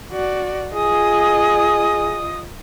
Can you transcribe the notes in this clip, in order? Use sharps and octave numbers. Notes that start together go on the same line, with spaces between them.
F#4 D5
F4 G#4 D#5 D#6